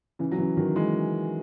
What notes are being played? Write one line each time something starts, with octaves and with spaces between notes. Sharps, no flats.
C#3 E3
F#3
C#3 E3
D#3 F#3
E3 G#3